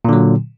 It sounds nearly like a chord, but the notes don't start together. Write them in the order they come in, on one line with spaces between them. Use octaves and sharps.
A#2 D3 F#3